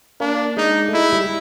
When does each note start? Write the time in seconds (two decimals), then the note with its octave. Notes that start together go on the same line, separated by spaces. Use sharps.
0.20 A#3 D4
0.57 G#3 D#4
0.88 A3
0.94 G#3 E4
1.13 G3